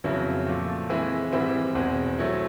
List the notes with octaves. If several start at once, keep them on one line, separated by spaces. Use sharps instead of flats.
F2 C#3 F#3 B3 E4
A#2 F3 A3
E3 G#3 C4 E4
G#2 E3 G3 C4 E4
E2 B2 G#3 C4
F#3 A3 C4 E4